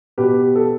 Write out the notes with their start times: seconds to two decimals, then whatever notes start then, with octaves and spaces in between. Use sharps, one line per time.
0.18 B2 G4 B4
0.55 A4